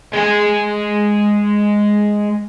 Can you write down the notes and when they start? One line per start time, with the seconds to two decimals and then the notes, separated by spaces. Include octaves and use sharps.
0.13 G#3 G#5